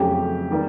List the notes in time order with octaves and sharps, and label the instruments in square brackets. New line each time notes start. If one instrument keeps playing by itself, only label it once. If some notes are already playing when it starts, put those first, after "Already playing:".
Already playing: [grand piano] F2 C#3 F#3 A3 C#4 [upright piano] G4
[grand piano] D#3 G3 A#3